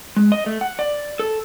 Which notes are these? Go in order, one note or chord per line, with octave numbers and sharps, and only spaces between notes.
G#3
D#5
A3
F#5
D5
A4